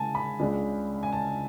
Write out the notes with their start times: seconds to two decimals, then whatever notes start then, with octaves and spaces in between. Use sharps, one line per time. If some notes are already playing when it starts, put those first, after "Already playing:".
Already playing: C#3 G#3 G#5 A5
0.15 B5
0.39 C#2 C#3 G#3 D4
1.03 G#5
1.13 A5